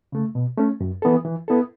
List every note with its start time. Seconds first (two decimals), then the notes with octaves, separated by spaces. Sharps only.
0.12 C#3 A3
0.35 B2
0.58 A3 C#4
0.81 F#2
1.02 E3 B3 A4
1.25 E3
1.48 B3 E4 A4